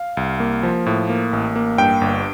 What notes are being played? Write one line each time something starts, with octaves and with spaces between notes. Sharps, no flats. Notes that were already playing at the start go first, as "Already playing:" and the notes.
Already playing: F5
C2
A#3
F3
A2
A#3
A1
A#3
G2 G5
G1